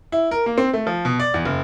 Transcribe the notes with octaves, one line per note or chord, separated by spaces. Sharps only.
E4
A#4
A#3
C4
A3
F3
B2
D5
E2
F#1